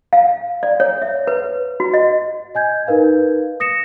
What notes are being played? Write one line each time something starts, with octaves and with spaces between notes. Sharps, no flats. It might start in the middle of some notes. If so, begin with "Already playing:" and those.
F5
D5
C#5
E5
B4
F#4
D#5
D#5 G#5 G6 G#6
D#4 A#4 B4 F5
D#6 A#6 C#7 E7